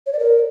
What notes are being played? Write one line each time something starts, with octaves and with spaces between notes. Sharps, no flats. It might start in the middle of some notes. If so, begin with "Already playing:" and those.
C#5
D5
A#4